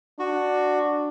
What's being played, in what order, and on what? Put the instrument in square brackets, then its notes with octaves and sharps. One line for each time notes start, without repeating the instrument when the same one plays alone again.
[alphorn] D4 [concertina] F#4